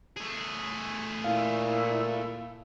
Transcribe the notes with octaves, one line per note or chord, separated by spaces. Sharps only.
A3 G#4
A#2 E4 F5